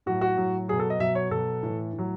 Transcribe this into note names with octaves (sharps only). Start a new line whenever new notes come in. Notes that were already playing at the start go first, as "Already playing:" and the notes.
A2 F#3 F#4
F#4
A2 F#3
B2 F#3 G#4
A4
D#5
B2 F#3 E5
C#5
B2 F#3 A4
A2 E3
A2
F#3